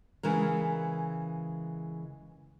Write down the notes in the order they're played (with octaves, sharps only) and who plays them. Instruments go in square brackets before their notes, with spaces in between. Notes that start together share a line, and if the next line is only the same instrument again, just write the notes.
[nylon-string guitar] C#3 E3 G#3 A#4